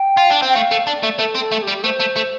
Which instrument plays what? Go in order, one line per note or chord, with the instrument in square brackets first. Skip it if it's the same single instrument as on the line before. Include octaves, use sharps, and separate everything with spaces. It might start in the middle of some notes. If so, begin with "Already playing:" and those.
Already playing: [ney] G5
[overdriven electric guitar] F4
D4
C4
[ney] G5
[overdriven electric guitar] A3 [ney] F5
[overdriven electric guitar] A3
[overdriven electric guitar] D4 [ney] D5
[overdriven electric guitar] A3
[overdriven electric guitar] A3 [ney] A4
[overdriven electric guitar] C4
[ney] A4
[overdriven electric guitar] A3
[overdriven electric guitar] G3 [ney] G4
[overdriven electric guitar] A3 [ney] C5
[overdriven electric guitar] A3
A3